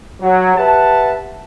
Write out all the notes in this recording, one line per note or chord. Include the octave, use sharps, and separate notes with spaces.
F#3
G4 B4 E5 F#5 A5